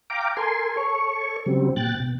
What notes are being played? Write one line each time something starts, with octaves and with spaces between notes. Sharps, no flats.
F5 G5 A#5 D6
A4 A#4 G#5 C6
A4 C#5 C#6
C#3 F#3 G3 C4
A#2 G5 F#6 A6
B2